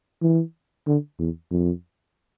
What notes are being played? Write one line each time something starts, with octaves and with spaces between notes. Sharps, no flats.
E3
D3
E2
F2